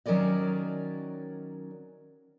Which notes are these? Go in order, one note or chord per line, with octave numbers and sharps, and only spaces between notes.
D#3 F#3 C#4 A#4 D5 D#5